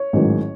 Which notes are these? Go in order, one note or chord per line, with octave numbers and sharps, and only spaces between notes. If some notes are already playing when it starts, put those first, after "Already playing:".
Already playing: C#5
A1 G#2 D#3 F#3